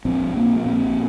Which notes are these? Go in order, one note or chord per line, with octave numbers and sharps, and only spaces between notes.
A#1 C4
A#1 A#3
A#3
A#2 C4